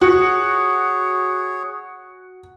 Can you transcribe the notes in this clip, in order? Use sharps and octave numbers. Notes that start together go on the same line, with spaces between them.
F#4 G#4 C#5